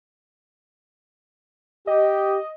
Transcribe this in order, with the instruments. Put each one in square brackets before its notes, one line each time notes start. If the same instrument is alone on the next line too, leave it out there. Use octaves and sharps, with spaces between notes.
[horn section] G4 [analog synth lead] D#5